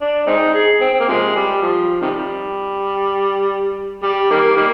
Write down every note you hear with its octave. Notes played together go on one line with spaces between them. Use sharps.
D4
G#3 C4 D#4
G#4
C4
C4
A#3
C3 F3 G#3
G3
F3
C3 D#3 G3
G3
D#3 G3 A#3
D#3 G3 A#3